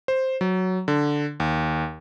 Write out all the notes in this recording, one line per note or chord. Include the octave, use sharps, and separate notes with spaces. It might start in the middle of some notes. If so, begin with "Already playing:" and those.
C5
F#3
D3
D#2